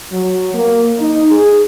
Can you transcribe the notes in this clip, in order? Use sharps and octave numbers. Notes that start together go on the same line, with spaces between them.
F#3
A#3
D#4
G#4